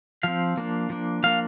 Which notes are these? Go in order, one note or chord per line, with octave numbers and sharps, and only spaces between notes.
F3 C4 F5
F3 A#3 D4
F3 A#3 D4
F3 A#3 D4 F5